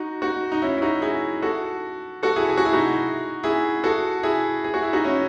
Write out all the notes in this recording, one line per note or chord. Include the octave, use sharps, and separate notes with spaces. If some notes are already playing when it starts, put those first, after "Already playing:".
Already playing: D#4 F#4
D#4 F#4
D#4
C#4 E4
E4
D#4 F#4
E4 G#4
F#4 A4
F#4 A4
E4 G#4
G#4
F#4
E4
D#4 F#4
E4 G#4
F#4 A4
E4 G#4
G#4
F#4
E4
D#4 F#4
C#4 E4